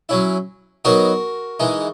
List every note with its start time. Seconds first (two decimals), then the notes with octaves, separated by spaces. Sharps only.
0.09 F#3 C#4 E4
0.85 F#3 B3 D#4 F#4 A#4
1.60 E3 G#3 D#4